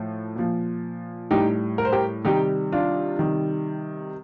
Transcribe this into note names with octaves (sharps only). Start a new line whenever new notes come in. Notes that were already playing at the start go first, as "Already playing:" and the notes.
Already playing: A2 F3
A#2 F3
A2 G3 D#4 G4
A#4
C5
G4 A#4
C3 D#3 G3 D#4 G4
D4 F4
C3 D#3 G3